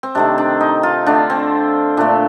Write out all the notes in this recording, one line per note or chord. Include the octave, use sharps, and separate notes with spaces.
C4
C3 D#3 A3 D4
D4
D#4
F4
D3 A3 D4
C4
A#2 A3 D4